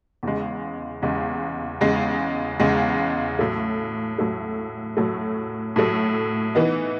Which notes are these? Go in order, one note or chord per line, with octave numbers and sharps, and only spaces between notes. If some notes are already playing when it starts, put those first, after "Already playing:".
E2 C#3 G#3
E2 C#3 G#3
E2 C#3 G#3
E2 C#3 G#3
A2 F#3 A3
A2 F#3 A3
A2 F#3 A3
A2 F#3 A3
E3 B3 D#4